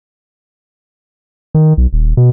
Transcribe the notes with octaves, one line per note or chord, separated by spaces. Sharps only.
D#3
B1
D#1
B2